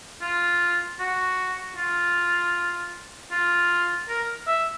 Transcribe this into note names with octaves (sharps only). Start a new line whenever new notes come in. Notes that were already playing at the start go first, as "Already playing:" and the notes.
F4
F#4
F4
F4
A#4
E5